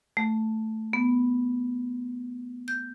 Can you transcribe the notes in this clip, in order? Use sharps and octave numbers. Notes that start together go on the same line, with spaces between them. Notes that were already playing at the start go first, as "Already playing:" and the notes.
A3
B3
G6